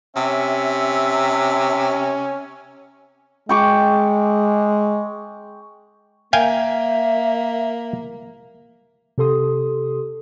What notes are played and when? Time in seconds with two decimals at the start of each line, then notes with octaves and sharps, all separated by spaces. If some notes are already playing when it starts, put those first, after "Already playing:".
0.16 C3 C#4 E5
3.49 G#3 G5 C#6 D6
6.33 A#3 E5 F5 G5 G#5
9.18 C3 G4 A4 C6 D#6